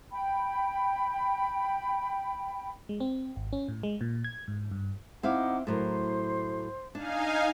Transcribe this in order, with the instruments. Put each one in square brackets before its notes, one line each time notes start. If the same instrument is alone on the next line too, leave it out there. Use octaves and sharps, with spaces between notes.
[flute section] G5 B5
[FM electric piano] G#3
C4
G#1
C#4
A2
G#3
A#2
G#6
G#2
G2
[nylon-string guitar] C4 E4 F5 [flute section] D#4 F#5 D6
[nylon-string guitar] A2 F#3 A#4 [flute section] C5 C6
[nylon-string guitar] D4 [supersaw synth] D#4 F5 G#5